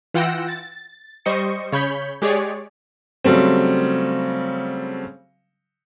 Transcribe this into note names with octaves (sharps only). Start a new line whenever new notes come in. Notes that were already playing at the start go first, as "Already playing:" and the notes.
E3 F4 F#5 G5 E6 A#6
A6
G3 C5 D#5 C#6 C#7
C#3 C#5 B5 G6
G#3 G4 G#4 C#5 D5
C#3 F#3 G3 A3 C4